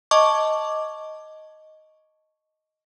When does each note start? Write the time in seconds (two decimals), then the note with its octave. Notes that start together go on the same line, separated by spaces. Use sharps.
0.11 D#5 A5 C#6 D6